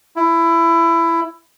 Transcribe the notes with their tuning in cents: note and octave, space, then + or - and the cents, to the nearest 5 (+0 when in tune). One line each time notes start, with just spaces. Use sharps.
E4 +15